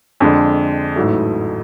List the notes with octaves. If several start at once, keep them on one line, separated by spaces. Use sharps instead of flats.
F2 D3 G#3 D4
A1 G#2 F#3 A3